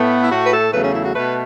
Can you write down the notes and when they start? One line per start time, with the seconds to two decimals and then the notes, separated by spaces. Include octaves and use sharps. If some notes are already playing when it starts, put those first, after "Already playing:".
Already playing: A2 A3 B3
0.21 E4
0.30 A2 A3 F#4
0.46 B4
0.51 A4
0.72 E2 C#3 F#3 A3 B4
0.83 C#4
0.93 E4
1.04 F#4
1.14 B2 A3 B4